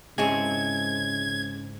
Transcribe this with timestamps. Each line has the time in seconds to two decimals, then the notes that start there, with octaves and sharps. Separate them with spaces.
0.18 G#2 C#3 C4 E4 G#4 D#5 C#6 G#6